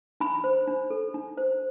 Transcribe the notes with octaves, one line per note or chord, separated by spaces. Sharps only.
D4 B5
C5
D4
A4
D4
C5